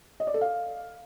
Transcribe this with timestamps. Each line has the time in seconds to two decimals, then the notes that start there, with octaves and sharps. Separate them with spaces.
0.20 D#5
0.27 D5
0.34 A4
0.41 F5